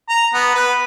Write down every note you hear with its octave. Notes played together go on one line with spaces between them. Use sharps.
A#5
B3
B4